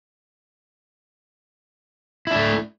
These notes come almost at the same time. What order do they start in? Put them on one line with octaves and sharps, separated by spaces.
E4 D4 A3